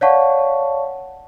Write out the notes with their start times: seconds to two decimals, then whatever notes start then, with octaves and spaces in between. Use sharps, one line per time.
0.01 C#5 D5 F5 F#5 A5 C#6